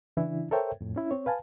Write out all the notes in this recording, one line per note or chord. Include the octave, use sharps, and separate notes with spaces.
C#3 E3 D4 E4
A4 A#4 C5 C#5 E5 G5
F2 A2
C#4 E4
C4 C#5
B4 F5 G#5 A5